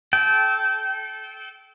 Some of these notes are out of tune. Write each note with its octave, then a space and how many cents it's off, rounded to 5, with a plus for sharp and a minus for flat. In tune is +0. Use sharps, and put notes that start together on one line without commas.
A4 -25 G5 -20